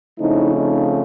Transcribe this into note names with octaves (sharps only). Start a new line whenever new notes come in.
C#3 F3 A3 C4 D#4 E4
D#4